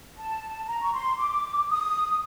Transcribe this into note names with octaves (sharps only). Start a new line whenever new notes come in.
A5
A#5
C#6
C6
D6
D#6